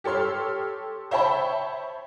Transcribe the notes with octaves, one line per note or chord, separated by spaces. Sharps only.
G4 A4 C#5 C6 F6
C5 C#5 E5 G5 A5 B5